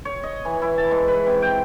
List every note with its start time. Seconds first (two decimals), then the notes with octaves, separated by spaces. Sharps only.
0.05 C#5
0.23 D#5
0.45 E3
0.62 E4
0.78 A5
0.91 G#2
1.08 B4
1.27 C3
1.42 G5